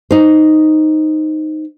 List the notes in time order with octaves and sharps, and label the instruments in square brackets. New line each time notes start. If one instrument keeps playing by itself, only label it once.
[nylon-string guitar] D#4 C5